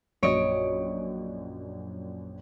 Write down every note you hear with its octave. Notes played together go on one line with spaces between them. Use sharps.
A#1 F#2 C#5 D#5 D7